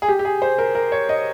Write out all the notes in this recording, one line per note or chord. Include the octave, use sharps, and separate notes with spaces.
G#4
G4
G4
G#4
C5
A#4
A#4
C#5
D#5